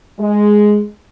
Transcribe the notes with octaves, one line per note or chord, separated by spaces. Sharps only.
G#3